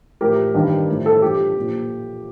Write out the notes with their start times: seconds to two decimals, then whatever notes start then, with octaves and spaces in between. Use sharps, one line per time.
0.21 A2 F3 G4 A#4
0.54 G2 D#3 G3
0.89 A2 F3
1.06 A4
1.22 G2 F3 G4
1.56 A#2 F3